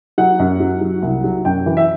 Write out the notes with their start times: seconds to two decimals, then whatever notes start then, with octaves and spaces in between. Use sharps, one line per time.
0.18 F#3 F#5
0.39 F#2
0.60 F#3
0.81 F#3
1.02 C2
1.24 F#3
1.45 F#2 G5
1.66 E3
1.77 E5